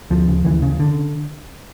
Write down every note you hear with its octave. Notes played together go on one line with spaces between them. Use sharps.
D2 F3
C#3
D2 E3
C#3
D3